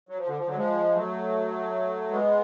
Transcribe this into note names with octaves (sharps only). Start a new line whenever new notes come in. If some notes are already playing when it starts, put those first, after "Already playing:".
F#3
F3
D3
F3
D3 F#3
F3 G#3
F#3 A3
G#3 B3